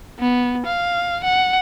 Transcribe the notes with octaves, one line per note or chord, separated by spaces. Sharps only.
B3
F5
F#5